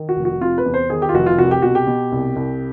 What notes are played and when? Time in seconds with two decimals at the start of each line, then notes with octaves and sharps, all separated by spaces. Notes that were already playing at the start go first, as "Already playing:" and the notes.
Already playing: D#3
0.09 F#4
0.16 F1
0.25 F#4
0.41 C3 F4
0.58 B4
0.65 E2
0.74 C5
0.90 D#3 G#4
1.02 G4
1.09 F4
1.14 F1 F#4
1.26 F4
1.38 C2 F#4
1.51 G4
1.62 B2 F#4
1.75 G4
1.87 B2
2.12 C2
2.36 C2